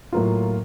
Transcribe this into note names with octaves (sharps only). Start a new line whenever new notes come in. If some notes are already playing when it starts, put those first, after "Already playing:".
A2 F#3 A#3 F4